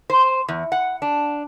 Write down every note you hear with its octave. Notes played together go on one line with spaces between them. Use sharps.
C5
E2
F#5
D4